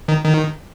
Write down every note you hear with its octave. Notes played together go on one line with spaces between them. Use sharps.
D#3
D#3